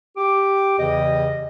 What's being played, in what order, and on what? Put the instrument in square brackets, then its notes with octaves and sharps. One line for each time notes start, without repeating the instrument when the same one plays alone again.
[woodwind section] G4 D6
E2 C#3 E3 G4 D#5